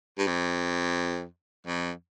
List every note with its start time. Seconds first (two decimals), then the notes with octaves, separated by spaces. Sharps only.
0.19 G2
0.27 F2
1.67 F2